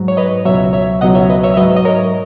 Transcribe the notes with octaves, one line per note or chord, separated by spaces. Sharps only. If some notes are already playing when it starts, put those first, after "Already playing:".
Already playing: G#2 F#3
C#5
B4 D#5
C#2 B2 F#3 C#5 E5
C#5 E5
C#2 B2 F#3 D#5 F#5
C#5 E5
B4 D#5
C#5 E5
E5
G#2 F#3 B4 D#5
D#5
A#4 C#5